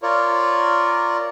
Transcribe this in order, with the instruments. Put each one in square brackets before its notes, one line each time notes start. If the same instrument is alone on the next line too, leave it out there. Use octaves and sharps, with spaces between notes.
[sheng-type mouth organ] F4 A#4 C#5 D5